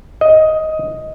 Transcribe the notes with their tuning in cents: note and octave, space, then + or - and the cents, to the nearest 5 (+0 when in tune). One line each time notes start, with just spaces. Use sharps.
D#5 +10